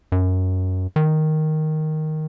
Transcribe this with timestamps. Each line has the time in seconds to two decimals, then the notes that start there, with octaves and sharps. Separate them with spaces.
0.12 F#2
0.96 D#3